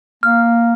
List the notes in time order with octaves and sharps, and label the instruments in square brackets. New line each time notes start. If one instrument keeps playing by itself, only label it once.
[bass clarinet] A#3 [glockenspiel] F6